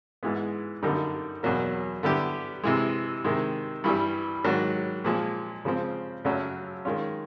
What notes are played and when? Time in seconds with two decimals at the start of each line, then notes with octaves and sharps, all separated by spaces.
0.23 G#2 E3 G#3 B3
0.83 F#2 D3 G3 A#3 D#4
1.43 E2 B2 F#3 A#3
2.03 D3 G3 B3 E4 G4
2.63 C3 E3 G#3
3.24 C3 D#3 G#3
3.84 G2 E3 G3
4.44 G#2 D#3 F#3
5.04 A#2 F3 G#3
5.65 C#3 F3 G#3 C4
6.25 F#2 C#3 F#3 A3 C#4
6.85 D#3 G#3 C#4 F4